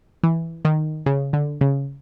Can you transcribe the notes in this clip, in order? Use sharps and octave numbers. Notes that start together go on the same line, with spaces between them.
E3
D#3
C#3
D3
C#3